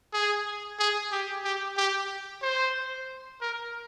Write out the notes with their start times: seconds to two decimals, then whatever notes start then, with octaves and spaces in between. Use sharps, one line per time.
0.13 G#4
0.79 G#4
1.12 G4
1.44 G4
1.77 G4
2.43 C5
3.41 A#4